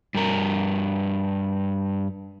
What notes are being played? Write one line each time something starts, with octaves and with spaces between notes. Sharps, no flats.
G2 A#4